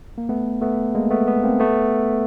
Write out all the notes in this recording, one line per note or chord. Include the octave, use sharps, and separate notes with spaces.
A#3
A3 B3
A3 B3
G#3 A#3
A3 B3
A3 B3
A#3 C4
A3 B3